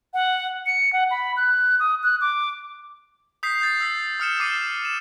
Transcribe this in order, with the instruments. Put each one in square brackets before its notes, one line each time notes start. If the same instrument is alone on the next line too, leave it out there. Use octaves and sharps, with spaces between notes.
[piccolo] F#5
C#7
F#5
B5
F#6
D#6
F#6
D6
[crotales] D#6 G6 B6 C7
G6 A6 C7
E6 B6
D#6 F6 C#7 E7
D6 E6 C7 D#7 E7
E7